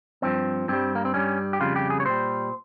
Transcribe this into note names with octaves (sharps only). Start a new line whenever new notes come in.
G2 F3 C4
G2 G3 C4
A#3
C4
G2 G3 C#4
G4
F2 C#3 G3 F4
G4
G#4
C#5
A#2 G3 C5